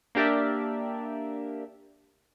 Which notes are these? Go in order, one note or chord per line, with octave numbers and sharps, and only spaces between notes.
A#3 D4 G4 A#4 D5 E5